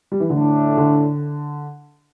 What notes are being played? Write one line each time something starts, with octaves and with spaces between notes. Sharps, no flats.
G3
E3
A2 D3 A3 D4
D3